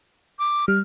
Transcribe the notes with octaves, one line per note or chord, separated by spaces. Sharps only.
D6
G3 F6